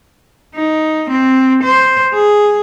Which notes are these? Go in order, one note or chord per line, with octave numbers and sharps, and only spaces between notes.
D#4
C4
C5
G#4